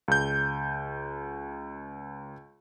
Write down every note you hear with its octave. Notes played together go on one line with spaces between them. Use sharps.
C#2 G6